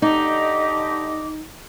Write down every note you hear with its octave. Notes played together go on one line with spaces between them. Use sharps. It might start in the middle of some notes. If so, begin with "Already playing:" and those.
D3 D#4 G4 D#5 D6